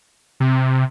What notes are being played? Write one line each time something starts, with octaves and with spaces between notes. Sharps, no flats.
C3